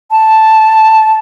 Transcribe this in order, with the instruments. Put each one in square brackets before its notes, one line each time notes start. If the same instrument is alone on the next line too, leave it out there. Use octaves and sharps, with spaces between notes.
[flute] A5